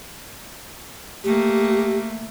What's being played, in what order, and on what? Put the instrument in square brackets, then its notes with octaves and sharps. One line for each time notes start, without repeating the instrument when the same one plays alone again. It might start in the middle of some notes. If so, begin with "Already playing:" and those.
[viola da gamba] A3 A#3 [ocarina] G4